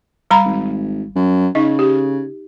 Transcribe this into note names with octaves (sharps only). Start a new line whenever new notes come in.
G3 A#5 B5
G#1
F#2
C#3 D#4 D#5
G4